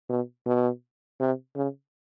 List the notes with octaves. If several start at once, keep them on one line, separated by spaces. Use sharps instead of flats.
B2
B2
C3
C#3